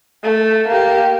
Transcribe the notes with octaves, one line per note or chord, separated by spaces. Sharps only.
A3
A#3 G4